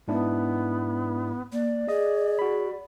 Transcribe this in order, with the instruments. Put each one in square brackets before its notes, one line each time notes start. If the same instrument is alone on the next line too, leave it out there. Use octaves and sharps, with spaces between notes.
[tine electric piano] G#2 D4 E4 [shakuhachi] B3
[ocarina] A#3 [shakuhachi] D5
[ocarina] G#4 [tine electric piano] D#5
[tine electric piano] F#4 B5